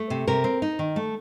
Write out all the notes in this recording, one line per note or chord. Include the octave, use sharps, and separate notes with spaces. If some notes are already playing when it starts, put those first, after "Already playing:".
Already playing: A3
C3
C3 A#4
C4
D#4
D#3
A3